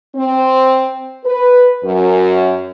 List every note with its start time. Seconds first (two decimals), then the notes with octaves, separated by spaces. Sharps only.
0.15 C4
1.25 B4
1.83 F#2